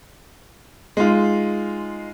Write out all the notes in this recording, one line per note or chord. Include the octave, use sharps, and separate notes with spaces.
G#3 D#4 F4